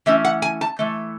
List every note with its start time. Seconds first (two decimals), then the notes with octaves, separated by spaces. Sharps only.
0.06 E3 A3 C#4 E5
0.25 F#5
0.42 G#5
0.61 A5
0.79 E3 A3